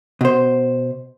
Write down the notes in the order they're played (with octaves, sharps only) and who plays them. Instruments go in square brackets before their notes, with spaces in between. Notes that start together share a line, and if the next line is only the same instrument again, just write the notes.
[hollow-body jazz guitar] B2 C5